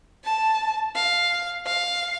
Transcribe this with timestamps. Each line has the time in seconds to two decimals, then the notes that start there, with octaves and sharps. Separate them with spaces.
0.24 A5
0.95 F5
1.66 F5